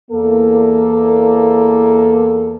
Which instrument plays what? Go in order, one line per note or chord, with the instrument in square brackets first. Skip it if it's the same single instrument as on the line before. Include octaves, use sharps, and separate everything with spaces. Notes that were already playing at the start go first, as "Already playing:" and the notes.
[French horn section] E2 A#3 A4